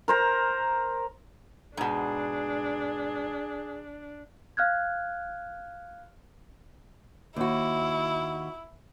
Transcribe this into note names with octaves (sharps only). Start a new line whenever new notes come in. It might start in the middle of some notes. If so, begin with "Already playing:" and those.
A#4 C5 A#5
G#2 B2 D4 G#4
F5 F6 F#6 G#6
D#2 E4 F#4